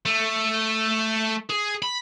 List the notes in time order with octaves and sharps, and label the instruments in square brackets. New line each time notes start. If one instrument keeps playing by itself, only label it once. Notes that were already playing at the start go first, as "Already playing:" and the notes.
[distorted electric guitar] A3
G#4
B5